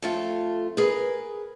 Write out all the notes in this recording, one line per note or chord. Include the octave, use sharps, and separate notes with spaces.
F2 A3 F4
G#4 A#4 B4